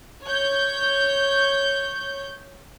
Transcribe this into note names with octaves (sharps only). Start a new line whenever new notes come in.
C#5 G6